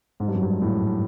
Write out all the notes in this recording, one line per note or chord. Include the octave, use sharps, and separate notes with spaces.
G#2
G2
F#2
G2
A2